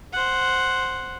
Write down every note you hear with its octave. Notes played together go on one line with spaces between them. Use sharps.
C5 F#5